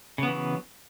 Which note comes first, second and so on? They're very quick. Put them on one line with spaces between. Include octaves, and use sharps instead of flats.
C#3 B3 E3 F#3